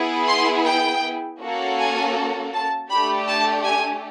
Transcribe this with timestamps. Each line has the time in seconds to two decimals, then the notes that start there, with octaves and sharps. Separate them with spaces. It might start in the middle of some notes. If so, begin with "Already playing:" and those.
Already playing: B3 E4 G#4
0.28 C6
0.66 G5
1.40 A#3 C#4 F#4 A4
1.78 G#5
2.53 A5
2.90 A3 D4 G4 B5
3.28 A5
3.65 G#5